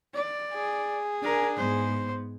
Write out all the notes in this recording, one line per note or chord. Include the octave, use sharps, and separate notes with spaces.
D5
G#4
D4 A#4 G#5
G#2 B3 C5